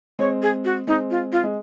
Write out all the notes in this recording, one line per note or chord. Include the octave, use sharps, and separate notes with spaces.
G#3 C4 C#5
G#4
F#4
G#3 C4 D#4
F4
F4
G#3